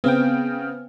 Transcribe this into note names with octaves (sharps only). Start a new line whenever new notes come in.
C#3 B3 C4 G5